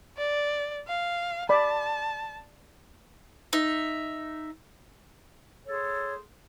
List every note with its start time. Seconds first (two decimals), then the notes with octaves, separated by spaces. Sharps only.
0.17 D5
0.87 F5
1.49 D5 A5 B5
3.53 D#4 E5
5.68 G#4 A4 C5 C#5